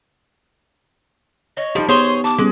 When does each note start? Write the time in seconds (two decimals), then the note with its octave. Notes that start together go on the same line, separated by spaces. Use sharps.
1.57 C#5 D#5
1.75 F3 G3 D#4 G4
1.89 B3 G#4 C5 C#5 C6
2.24 A5 D6
2.38 G3 G#3 B3 C#4